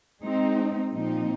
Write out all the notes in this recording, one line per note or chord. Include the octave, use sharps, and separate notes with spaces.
G#3 C4 D#4
A#2 F3 C4 D#4